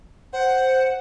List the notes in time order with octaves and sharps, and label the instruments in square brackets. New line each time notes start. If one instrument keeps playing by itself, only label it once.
[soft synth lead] C5 [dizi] F#5